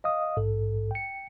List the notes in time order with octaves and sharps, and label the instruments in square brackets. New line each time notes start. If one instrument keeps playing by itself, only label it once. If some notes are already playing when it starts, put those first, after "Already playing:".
[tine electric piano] D#5 F5 D#6
A#1 G#2 A4
G5 C#7